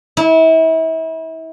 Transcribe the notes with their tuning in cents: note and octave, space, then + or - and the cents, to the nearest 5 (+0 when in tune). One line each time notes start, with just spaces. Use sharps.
E4 -35